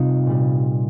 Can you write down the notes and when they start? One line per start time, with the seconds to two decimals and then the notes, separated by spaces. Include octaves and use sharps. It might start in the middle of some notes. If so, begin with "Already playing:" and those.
Already playing: C3 G3 D#4 F4
0.26 A#2 G3